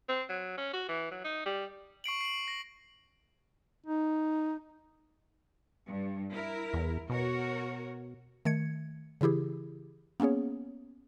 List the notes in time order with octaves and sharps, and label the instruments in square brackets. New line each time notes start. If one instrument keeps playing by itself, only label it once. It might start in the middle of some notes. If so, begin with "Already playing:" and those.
[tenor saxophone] C4
F#3
C#4
F#4
E3
F#3
D#4
G3
[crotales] C#6 C7 D7 F#7
C7 F#7
A#6
[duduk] D#4
[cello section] G2
E4 A#4
[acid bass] E2
[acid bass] B2 [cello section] F#4 A#4 C#5
[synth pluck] D#3 A3 G#6 C#7
C#3 E3 E4 G4 G#4
A#3 B3 C#4 G#4 C#5